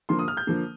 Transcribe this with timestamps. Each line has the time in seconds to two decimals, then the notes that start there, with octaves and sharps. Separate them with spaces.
0.09 D3 F3 A#3 C6
0.19 D#6
0.28 F6
0.37 G6
0.47 D3 F3 A#3